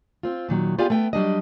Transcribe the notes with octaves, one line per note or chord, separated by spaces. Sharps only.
C4 F4
A#2 D#3 F#3
B3 F4 G4 G#4 D5 F5
A3 B3 G5
F#3 G3 D4 D#5